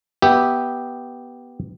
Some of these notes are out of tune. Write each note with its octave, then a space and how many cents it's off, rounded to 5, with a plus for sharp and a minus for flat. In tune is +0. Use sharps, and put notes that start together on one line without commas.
B3 -15 G4 -5 E5 -10